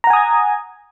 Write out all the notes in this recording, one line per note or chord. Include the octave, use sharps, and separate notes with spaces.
F#5 G#5 A#5 D#6 G#6